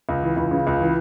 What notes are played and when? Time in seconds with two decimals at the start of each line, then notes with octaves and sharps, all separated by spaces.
0.09 C#2
0.23 E3
0.37 C#2
0.51 C#3
0.67 C#2
0.80 E3